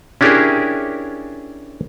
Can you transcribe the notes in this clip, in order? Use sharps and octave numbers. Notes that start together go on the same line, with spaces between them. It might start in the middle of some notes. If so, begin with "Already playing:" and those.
C#4 D4 E4 G4 G#4 A#4